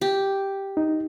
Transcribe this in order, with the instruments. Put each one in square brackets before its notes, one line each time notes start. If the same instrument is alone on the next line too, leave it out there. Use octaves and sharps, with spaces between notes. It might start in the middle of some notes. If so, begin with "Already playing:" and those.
[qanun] G4
[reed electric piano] D#4